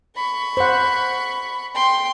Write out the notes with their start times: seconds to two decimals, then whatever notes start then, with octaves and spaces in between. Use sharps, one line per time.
0.16 B5 C#6
0.57 C5 F#5
1.75 G5 C6